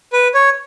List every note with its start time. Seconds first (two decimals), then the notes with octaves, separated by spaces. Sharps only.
0.13 B4
0.34 C#5